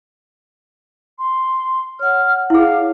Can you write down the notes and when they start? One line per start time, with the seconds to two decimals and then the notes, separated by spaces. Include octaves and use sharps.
1.18 C6
1.99 C#5 F#5 F6
2.50 E4 G#4 F5